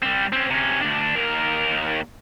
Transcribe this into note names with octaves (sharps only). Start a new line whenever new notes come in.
G3 C4
C4 C#4
C3 C#4
D2 D4
D#2 A#4